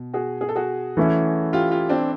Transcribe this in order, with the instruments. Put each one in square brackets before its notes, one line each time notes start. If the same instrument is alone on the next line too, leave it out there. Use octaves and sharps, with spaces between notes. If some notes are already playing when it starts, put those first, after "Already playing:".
Already playing: [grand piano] B2
[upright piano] F#4 G#4
G#4
A4
F#4 G#4
[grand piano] E3 A3 C#4 E4
[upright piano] F4 G4
F4 G4
C4 D4